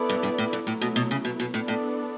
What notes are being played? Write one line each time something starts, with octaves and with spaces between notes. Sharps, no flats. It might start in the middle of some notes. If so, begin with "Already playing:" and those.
Already playing: B3 E4 A4 D5
G2
G2
A2
G2
A2 F#3 A3 E4
B2
B2
C#3
B2
B2
A2 B3 D4 A4 D5
A2